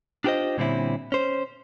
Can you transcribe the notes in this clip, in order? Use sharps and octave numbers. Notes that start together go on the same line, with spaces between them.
D4 F4 G4 A4 C5 D#5
A#2 D3 G3 C4 C#4 E4
C#4 C5